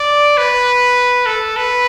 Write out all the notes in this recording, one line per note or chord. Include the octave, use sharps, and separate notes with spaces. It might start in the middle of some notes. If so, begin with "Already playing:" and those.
Already playing: D5
B4
A4
B4